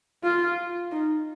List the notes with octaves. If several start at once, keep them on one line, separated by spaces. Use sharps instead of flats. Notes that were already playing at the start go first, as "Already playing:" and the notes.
F4
D#4